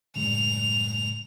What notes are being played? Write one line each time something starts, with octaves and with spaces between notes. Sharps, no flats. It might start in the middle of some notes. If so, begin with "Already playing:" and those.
F#1 A2 G#3 F7